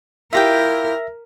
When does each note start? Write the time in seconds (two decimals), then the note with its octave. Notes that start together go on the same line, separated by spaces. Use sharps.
0.33 E4 F4 G4 A#4 E5 G5 A#6